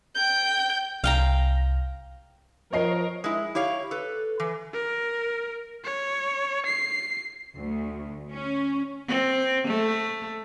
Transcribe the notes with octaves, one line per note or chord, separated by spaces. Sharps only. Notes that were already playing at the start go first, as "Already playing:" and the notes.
G5 G6
C2 F5 G5 A#5
F3 A#4 C#5 D#5 C7
G#3 E4
E4 G4 C#5 F5
A4 B4
E3
A#4
C#5
C7
D2
C#4
C4
A3